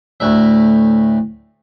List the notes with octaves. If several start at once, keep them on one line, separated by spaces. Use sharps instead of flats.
D2 A2 E5